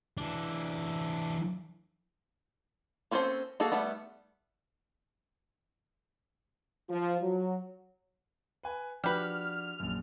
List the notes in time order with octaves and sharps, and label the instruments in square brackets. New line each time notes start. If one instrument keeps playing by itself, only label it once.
[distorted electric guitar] E3 D4
[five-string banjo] A#3 C4 C#4 A4 C5
A#3 F#4 G#4 A4
G3 A3 B3
[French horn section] F3
F#3
[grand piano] B4 G#5
[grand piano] F3 D4 F#4 [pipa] G4 B4 [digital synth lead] F6
[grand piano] A#1 F#2